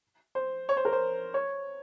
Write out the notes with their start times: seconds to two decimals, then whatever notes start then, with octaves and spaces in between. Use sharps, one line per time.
0.35 C5
0.69 C#5
0.77 C5
0.85 A#4
0.92 C5
1.34 C#5